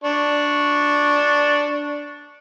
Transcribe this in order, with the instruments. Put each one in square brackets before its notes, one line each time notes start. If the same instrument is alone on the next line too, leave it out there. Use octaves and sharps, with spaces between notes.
[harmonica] D4 C#6